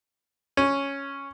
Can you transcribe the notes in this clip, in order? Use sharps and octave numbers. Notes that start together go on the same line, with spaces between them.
C#4